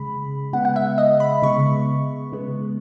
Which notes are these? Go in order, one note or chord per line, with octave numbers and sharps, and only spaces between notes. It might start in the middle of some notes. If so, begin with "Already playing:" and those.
Already playing: C#3 G#3 B5
C#3 G#3 B3 F#5
F#5
E5
D#5
B5
C#3 G#3 B3 C#6
C#3 G#3 B3